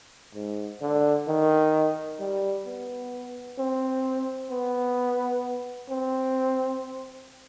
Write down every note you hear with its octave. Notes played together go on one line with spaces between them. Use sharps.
G#2
D3
D#3
G3
B3
C4
B3
C4